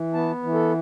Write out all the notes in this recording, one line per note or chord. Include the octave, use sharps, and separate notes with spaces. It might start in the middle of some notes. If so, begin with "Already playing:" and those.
Already playing: E3
B3 A5
E3
A4